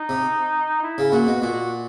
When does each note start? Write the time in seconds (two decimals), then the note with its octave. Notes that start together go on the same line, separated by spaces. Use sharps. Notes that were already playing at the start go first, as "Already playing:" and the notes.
Already playing: D#4
0.09 C3
0.83 E4
0.98 C#3
1.12 A#2 F#4
1.27 B2
1.42 A#2 F#4